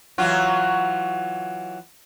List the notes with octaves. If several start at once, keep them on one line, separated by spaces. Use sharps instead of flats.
E3 F#3 F4